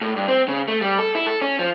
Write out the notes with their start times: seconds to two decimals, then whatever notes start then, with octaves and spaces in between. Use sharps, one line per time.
0.01 A2
0.16 G2
0.28 C4
0.48 C#3
0.68 A3
0.81 G3
0.99 A4
1.15 E4
1.27 A4
1.42 C#4
1.59 F3